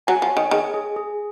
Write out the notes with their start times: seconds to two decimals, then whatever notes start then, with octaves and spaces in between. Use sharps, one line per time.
0.07 F#3 G#5
0.22 F3
0.29 C#5
0.37 D#3
0.51 D#3 G#4
0.74 G#4
0.96 G#4